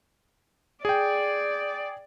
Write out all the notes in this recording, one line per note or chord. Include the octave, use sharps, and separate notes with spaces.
G#4 D5 G5